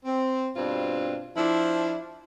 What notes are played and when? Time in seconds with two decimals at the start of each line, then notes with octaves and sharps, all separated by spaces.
0.05 C4
0.56 G2 B2 C4 D4 F4
1.37 F3 D4 E4